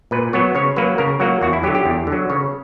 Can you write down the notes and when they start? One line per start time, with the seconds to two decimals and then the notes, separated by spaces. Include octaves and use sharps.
0.11 A#2 B4
0.33 F#3 B3 C#5
0.55 C#3 C#5
0.76 F#3 A#3 B4
0.98 C#3 A#4
1.20 F#3 A#3 F#4
1.41 E2 F#4
1.53 E4
1.63 F#3 G4
1.67 D3
1.75 G4
1.86 E2
2.07 D3
2.12 F#3
2.30 C#3 C#5